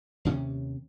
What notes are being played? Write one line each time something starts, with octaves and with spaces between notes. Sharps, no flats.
D#2 C3 B3 C#4